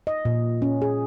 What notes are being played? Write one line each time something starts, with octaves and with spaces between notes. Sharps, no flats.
D#5
A#2
C#4
G#4